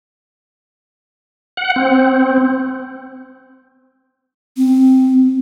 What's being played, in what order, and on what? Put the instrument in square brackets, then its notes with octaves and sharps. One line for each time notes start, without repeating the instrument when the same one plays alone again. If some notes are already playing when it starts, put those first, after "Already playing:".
[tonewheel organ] F#5
C4
[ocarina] C4